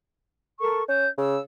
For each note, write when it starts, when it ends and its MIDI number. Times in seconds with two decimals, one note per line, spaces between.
0.59 0.83 69
0.59 0.83 70
0.59 0.83 85
0.89 1.07 61
0.89 1.08 91
1.18 1.38 49
1.18 1.38 88